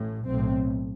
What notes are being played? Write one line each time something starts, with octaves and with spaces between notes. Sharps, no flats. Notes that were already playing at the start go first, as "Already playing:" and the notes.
Already playing: A1 A2
B1 A2 C4